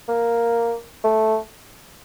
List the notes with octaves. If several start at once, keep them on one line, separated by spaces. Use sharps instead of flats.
A#3
A3